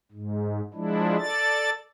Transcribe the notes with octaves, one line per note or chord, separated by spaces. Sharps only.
G#2
F3 G#3 D4 E4
A4 D5 A6